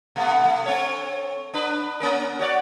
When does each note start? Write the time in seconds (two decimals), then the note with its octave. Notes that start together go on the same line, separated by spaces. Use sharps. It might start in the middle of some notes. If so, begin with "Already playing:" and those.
0.16 B2 A3 B3
0.45 A3
0.66 C4 A4 C#5
1.54 D4 B4
2.00 A#3 C#4 A#4
2.39 F#4 C#5 D5